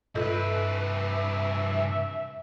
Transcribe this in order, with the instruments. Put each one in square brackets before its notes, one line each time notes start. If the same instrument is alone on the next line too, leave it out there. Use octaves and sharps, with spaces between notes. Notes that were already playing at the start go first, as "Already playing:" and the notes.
[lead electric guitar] C2 B4 [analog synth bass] G2 [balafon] F4 A4 D#5 [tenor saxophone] E5